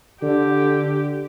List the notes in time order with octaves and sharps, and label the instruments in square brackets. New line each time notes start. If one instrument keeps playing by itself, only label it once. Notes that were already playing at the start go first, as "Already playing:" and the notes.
[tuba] D3 [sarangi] G4